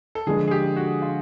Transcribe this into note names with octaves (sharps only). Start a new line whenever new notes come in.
A4
D3 F3 G#3 G#4
G#4
G4
F#4
F4